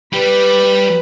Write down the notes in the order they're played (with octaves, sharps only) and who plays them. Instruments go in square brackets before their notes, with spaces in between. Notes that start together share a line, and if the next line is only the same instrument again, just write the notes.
[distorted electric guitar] G3 G4 [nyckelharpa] B4 B5